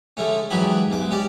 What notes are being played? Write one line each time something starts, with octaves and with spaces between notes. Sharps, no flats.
D3 G#3 A3 C#4
E2 G#2 F#3 G4 G#4 B5
B1 G#3 D6
C#4 G4 D5